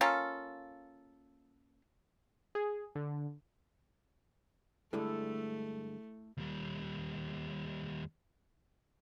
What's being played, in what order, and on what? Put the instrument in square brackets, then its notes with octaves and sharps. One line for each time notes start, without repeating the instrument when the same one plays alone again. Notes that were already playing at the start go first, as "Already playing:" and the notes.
[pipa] A#3 C#4 F4 A4
[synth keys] G#4
D3
[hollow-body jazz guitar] G2 D3 G#3 [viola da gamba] A3 [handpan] E4 A4
[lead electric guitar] D#2 G3